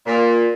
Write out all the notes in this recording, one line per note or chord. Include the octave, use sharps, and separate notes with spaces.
A#2